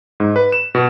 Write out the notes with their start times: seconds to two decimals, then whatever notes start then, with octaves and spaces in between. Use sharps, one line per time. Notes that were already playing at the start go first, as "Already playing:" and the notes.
0.20 G#2
0.36 B4
0.52 E7
0.75 B2